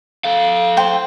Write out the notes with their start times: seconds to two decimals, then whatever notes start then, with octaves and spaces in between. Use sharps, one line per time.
0.25 A4 F5
0.77 C5 G5